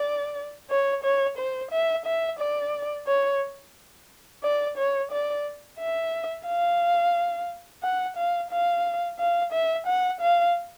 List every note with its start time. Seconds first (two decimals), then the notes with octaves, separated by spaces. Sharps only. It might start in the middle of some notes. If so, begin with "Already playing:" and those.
Already playing: D5
0.70 C#5
1.04 C#5
1.38 C5
1.72 E5
2.06 E5
2.39 D5
3.07 C#5
4.43 D5
4.77 C#5
5.11 D5
5.79 E5
6.47 F5
7.83 F#5
8.17 F5
8.51 F5
9.19 F5
9.52 E5
9.87 F#5
10.21 F5